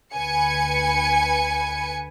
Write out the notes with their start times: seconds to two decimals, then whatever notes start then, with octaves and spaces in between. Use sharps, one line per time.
0.14 D2 B4 G#5 C#7